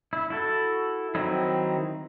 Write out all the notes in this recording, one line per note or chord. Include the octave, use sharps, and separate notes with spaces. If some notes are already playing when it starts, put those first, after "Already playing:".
E4
E4 F#4 A4
D#3 F#3 C4 D#4 E4